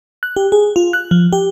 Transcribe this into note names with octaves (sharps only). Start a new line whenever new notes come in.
F#6
G4
G#4
F4
F#6
F3
G4